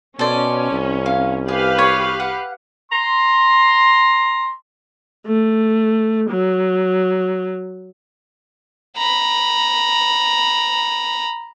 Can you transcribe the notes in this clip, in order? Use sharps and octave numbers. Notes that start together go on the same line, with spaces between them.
B2 C#4 A4 C5 D5
C2
F5
G4 G#4 B4 F5
C#5
F#5
A#5 C6
A3
F#3
A#5 B5